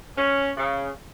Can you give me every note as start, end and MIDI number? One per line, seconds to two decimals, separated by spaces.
0.17 0.50 61
0.57 0.90 49